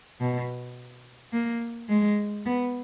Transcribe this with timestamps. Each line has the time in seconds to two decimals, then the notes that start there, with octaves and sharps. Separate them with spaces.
0.21 B2
1.33 A#3
1.89 G#3
2.46 B3